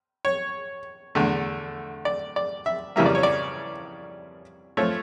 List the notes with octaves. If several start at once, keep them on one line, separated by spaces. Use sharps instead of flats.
C#5
E2 D3 A3
D5
D5
E5
F2 C#3 E3 G3 A#3 E5
D5
C#5
D5
F3 A3 C#5